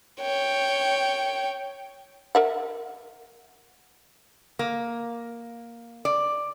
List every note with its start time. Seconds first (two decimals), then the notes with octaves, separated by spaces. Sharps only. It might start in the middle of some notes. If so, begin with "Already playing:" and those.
0.21 C#5 G5
2.35 A#4 E5 F#5
4.59 A#3
6.05 D5